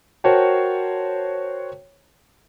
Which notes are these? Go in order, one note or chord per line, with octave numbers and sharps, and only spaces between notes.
F#4 A#4 C5 C#5 G5 A5